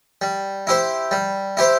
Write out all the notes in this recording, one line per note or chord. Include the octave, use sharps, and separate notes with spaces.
G3
E4 G4 C5
G3
E4 G4 C5